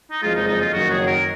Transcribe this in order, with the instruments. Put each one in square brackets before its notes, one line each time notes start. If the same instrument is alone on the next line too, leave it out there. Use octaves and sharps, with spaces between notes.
[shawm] D#4
[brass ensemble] F#1 F2 F3 G#3 [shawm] F4
[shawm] D#4
D#4
F4
[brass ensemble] F#1 F#2 D#3 F#3 [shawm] F#4
[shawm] G#4
A#4